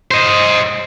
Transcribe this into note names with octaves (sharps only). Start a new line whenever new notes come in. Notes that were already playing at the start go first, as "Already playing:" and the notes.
C5 D#5